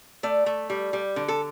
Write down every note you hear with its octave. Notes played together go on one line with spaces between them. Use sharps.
A3 D5
A3
G3
G3
D3
A4